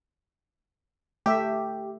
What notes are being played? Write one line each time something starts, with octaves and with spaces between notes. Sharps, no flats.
A3 G4 E5